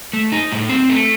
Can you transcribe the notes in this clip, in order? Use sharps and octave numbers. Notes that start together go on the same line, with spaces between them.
A3
D#4
A2
C4
A3